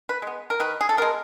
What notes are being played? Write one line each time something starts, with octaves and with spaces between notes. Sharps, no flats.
B4
G#3 B3
A#4
D#3 B4
G#4
A4
G#3 B3 A#4